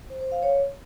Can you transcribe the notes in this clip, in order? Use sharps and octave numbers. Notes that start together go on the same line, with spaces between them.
C5
C5
F5
C#5